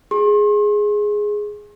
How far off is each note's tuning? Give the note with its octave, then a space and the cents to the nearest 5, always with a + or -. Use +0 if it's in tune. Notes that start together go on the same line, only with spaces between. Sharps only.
G#4 +0 C6 +40